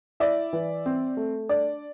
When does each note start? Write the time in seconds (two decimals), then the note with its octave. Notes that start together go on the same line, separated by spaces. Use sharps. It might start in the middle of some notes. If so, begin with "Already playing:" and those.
0.20 E4 D5 E5
0.53 E3
0.86 C4
1.17 A3
1.49 D4 D5